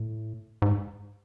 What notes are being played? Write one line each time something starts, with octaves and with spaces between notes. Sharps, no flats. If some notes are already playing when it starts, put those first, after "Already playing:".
Already playing: A2
G#2